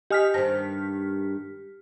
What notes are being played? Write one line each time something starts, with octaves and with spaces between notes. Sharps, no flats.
G4 D#5 G#5 D#6 F6 B6
G2 D#3 C5 A5 A#6